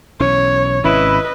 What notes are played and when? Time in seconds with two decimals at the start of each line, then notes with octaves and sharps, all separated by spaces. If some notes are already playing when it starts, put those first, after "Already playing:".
0.20 B1 E3 C#4 C#5
0.84 G#1 C3 C#4 E4 B4 D#5